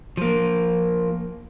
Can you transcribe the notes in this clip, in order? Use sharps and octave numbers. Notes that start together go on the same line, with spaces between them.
F3 A#3